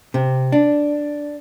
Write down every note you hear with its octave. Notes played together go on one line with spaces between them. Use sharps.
C3
D4